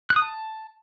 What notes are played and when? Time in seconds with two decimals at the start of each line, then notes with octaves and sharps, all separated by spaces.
0.10 F#6
0.16 D#6
0.22 A5